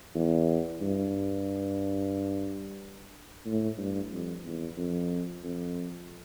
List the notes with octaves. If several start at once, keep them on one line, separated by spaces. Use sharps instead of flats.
E2
G2
A2
G2
F2
E2
F2
F2